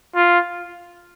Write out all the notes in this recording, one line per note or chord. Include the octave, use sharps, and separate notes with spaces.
F4